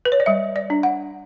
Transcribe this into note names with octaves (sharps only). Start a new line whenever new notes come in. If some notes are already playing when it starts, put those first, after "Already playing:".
B4
C#5
D5
G3 E5
D5
D4
F#5